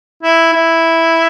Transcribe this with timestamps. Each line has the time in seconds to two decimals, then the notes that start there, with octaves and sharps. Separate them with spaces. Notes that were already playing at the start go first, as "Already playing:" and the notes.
0.23 E4
0.53 E4